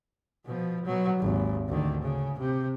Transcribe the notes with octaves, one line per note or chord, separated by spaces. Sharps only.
B2 F3
B2 F#3
G#1 D#2
D2 D#3
C#3
C3